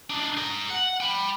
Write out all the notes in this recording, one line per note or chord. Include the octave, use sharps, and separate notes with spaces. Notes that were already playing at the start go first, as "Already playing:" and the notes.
D4 D#4
G#4 A#5
F#5
G5 B5